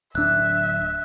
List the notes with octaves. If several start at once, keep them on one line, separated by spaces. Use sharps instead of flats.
D1 D4 E5 E6 F#6